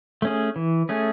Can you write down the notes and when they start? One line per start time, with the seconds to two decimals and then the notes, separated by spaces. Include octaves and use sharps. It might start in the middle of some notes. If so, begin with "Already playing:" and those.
0.22 A3 C#4 G#4
0.56 E3
0.89 A3 C#4 G#4